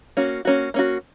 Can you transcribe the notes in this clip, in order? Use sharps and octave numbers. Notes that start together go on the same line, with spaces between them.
A#3 C#4 F#4
A#3 C#4 F#4
A#3 C#4 F#4